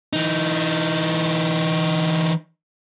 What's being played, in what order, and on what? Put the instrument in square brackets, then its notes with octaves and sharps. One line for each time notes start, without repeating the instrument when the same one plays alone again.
[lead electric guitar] E3 D#4